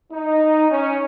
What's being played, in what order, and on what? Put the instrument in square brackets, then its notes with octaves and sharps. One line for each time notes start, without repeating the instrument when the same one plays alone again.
[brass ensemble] D#4
C#4